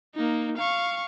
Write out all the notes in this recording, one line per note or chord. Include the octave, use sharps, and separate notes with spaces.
A#3 D#4
F5 C#6